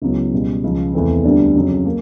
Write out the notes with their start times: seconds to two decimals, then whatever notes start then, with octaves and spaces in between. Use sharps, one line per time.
0.02 C#2 C#3 F#3 B3 E4
0.33 C#2 B2 G3
0.64 C#2 C#3 F3
0.94 E2 C3 E3 A3 C4
1.24 D2 D3 G3 B3 D4
1.55 F2 C#3 F#3
1.86 A#3